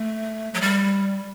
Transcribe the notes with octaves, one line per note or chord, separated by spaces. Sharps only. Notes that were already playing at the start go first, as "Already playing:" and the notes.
Already playing: A3
F#3
G3